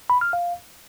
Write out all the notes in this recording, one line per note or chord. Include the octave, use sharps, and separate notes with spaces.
B5
F6
F5